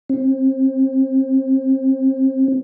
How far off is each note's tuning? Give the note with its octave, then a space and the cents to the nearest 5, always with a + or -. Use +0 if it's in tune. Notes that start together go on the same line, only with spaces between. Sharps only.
C4 +30